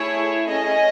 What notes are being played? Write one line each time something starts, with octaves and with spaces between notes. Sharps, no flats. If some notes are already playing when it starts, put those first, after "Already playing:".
Already playing: A3 E4 G#4 C#5
C#4 G#4 D#5